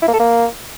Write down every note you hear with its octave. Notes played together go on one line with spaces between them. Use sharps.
E4
A#3
A4
A#3